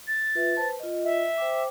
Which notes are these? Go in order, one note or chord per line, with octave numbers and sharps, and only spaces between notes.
A6
F4 B4 E5
B4 C5 A5
F4 D#5
E5
C5 G5 D6